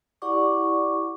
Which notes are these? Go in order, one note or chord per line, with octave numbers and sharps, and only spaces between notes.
E4 G4 D5 F#5 C#6 D6